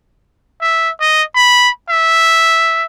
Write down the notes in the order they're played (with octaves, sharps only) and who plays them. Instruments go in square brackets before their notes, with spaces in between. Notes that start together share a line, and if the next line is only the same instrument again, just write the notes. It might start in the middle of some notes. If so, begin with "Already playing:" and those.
[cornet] E5
D#5
B5
E5